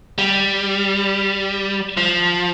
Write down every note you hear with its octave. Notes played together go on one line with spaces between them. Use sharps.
G3
F3